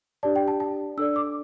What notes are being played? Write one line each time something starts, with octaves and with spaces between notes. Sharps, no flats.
D4 G4 D5 A5
G5
A5
A5
D4 A4 D5 E6
D6